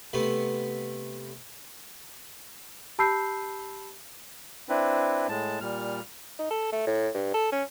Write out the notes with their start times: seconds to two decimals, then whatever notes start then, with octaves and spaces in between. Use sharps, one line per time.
0.13 C3 A3 B3 B5
2.99 G4 A5 B5 E6 G6 C7
4.69 C4 D4 E4 B4
5.29 A2 G#3 A5
5.61 A#2 G3 F6
6.39 D#4
6.51 A4
6.73 A3
6.87 A2
7.15 G2
7.34 A4
7.52 C#4